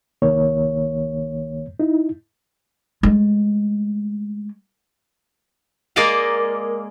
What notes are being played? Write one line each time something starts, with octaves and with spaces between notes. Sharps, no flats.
C2 D#3 A#3 C#5
D#4 E4
G#3 A3
G#3 A#3 A#4 D5 D#5 F5